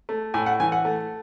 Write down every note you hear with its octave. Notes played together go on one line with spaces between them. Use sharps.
A3
A2 G#5
F#5
E3 G#5
F#5
A3